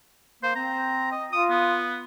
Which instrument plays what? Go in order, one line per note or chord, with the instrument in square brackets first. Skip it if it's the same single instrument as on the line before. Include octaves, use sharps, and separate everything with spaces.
[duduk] A#3 [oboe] C5
[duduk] C4 [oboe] A#5
[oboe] D#5
[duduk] F4 [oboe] D#6
[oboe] B3